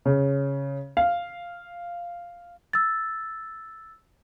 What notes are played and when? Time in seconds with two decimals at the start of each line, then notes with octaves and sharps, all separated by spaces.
0.05 C#3
0.97 F5
2.73 E6 A6